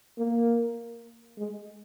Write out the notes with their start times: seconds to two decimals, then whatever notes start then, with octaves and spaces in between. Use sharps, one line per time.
0.19 A#3
1.39 G#3